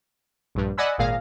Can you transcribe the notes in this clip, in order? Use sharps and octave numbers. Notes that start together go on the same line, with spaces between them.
A#1 G2
D5 D#5 F#5 G#5 B5 E6
G#1 A#2 G#4 F5 A#6